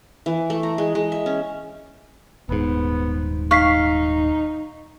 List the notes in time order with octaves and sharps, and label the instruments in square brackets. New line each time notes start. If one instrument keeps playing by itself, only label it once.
[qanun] E3
A3
A#5
G#3
G#3
E5
C#4
[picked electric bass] D#1 G#2 [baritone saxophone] B3
[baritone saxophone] D#4 [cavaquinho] F5 [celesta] C#6 B6 C7